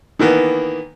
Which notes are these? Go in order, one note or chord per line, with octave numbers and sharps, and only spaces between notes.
D#3 E3 A#3 B3